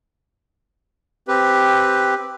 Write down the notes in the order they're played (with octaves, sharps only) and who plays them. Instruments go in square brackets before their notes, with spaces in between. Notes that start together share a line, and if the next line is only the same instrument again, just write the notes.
[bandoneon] C4 G4 B4